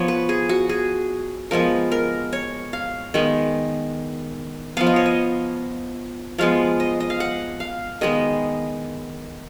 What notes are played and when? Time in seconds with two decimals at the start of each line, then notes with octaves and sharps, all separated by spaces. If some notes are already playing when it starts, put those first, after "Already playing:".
Already playing: F3 B3 C#5
0.08 B4
0.29 G#4
0.49 F#4
0.69 G#4
1.51 F3 G#3 B3 A#4
1.92 A#4
2.33 C#5
2.73 F5
3.14 D#3 G#3 B3
4.77 F3 B3 F5
4.86 D#5
4.96 C#5
5.06 D#5
6.38 F3 G#3 B3 F5
6.80 D#5
7.00 D#5
7.10 F5
7.20 F#5
7.60 F5
8.01 D#3 G#3 B3 D#5